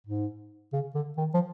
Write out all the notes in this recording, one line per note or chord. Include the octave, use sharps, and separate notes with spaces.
G#2
C#3
D3
D#3
F3